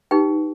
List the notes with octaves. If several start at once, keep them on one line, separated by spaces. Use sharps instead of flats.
D#4 G4 B4 G5